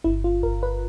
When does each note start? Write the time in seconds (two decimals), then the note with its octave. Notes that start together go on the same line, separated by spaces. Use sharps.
0.04 G1 E4
0.24 F4
0.43 G1 A#4
0.63 B4